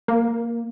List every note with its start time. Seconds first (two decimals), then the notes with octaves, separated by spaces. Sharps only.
0.08 A#3